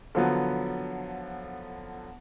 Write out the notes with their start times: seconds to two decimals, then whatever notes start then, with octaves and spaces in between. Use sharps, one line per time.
0.15 D3 F3 F#3 B3